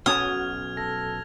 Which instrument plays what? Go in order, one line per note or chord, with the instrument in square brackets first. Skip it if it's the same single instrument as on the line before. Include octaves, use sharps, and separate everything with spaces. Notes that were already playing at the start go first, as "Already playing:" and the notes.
[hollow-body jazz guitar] B1 C#4 A5 [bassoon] F#4 [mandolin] D#6 [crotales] F6 G#6 F7
[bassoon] A4 [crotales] A#6